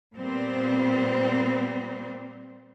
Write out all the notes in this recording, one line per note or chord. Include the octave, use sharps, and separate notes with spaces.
A#2 G3 B3 C4 C5